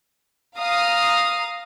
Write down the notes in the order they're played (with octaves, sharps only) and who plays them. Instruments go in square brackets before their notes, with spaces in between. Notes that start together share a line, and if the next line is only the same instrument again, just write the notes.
[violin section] F5 A#5 D#6